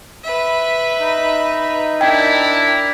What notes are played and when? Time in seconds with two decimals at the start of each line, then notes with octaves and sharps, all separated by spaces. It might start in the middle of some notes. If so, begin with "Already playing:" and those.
0.23 B4 E5
1.00 D#4
2.01 D4 E4 A#4 G5